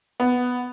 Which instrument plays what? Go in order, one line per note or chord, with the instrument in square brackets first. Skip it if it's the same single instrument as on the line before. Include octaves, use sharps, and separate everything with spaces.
[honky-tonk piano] B3